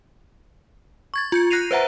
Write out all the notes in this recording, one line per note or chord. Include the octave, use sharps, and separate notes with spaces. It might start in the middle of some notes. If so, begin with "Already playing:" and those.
C#6 G#6 A6
F4 G6 C#7
F#6 A#6 C7 D#7 F7
B4 C5 E5 F#5 A#5